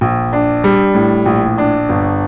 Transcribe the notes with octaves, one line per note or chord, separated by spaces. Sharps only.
A#1
D4
G3
A2
A#1
D4
G1